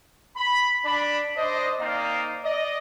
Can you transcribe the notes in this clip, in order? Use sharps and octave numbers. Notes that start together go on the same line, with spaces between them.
B5
D4 B5
D4 C5 D#5
A#3 C4 D#4 C5 D5 F5
D5 D#5